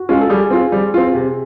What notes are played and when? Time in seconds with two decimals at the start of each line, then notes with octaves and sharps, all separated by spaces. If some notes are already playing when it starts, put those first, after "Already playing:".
Already playing: F#4
0.09 G#3 C#4 F4
0.21 A4
0.29 G3 G#4
0.51 C4 F4
0.72 G3
0.94 C4 F4
1.14 C3